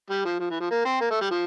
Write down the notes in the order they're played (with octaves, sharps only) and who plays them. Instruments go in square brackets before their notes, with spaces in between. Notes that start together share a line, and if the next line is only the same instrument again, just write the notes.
[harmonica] G3
F3
F3
E3
F3
A#3
C4
A#3
A3
G3
F3